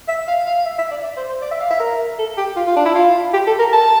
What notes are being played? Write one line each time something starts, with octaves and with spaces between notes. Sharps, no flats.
E5
F5
F5
E5
E5
D5
D5
C5
C5
D5
E5
F5
E5
A#4
A4
G4
F4
F4
D4
E4
F4
G4
A4
A#4
A5